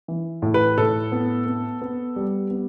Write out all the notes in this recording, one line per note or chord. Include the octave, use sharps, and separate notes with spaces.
E3
A2
B4
A2 A4
B3
B3
B3
G3
B3